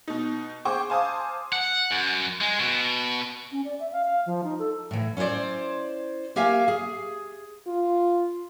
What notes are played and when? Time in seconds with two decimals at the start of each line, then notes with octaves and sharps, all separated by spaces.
0.08 B2 D#4
0.65 G#4 C5 G5 C#6 D6
0.90 C5 F5 G#5 A5 D6 D#6
1.53 F#5
1.91 F#2
2.41 G#3
2.60 B2
3.52 C#4
3.65 D5
3.80 E5
3.93 F5
4.05 F5
4.26 F3
4.44 D#4
4.59 A4
4.91 A2 E3
5.17 C#4 E4 B4 C5 D5
6.36 A#3 G4 E5 F5 G#5
6.68 G#4
7.67 F4